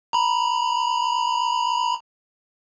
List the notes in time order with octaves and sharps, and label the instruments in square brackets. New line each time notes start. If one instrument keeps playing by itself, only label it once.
[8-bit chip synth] A#5 B5